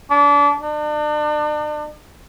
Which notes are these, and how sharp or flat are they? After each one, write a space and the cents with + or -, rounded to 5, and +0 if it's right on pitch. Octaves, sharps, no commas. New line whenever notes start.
D4 -30
D4 +40